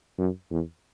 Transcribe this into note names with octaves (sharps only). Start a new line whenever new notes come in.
F#2
E2